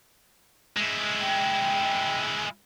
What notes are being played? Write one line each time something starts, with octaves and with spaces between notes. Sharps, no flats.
G#3 E4
G5